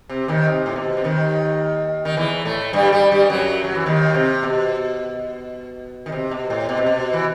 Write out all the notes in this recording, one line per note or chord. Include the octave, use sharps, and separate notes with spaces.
C3
D#2 D#3
C3
A2
B2
C3
D#2 D#3
D#3
E2 E3
A2 A3
G2 G3
G2 G3
G2 G3
F#2 F#3
F#3
E3
D#2 D#3
C3
B2
D#3
C3
B2
A2
B2
C3
B2
E3